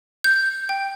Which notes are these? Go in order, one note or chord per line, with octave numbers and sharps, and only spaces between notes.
G6
G5